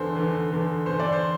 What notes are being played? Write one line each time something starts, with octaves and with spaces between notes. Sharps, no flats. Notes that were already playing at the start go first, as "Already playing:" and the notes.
Already playing: E2 D3 C5
E2 D3
E2 D3
E2 D3 C5
D5
C5